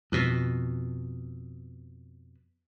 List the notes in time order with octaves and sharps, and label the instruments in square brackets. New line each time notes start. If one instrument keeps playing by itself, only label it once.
[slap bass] F2 B2